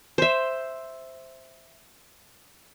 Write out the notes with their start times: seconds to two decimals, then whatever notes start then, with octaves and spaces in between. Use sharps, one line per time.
0.18 C5 E5